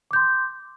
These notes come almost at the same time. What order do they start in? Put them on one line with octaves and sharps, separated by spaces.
D6 G6 C6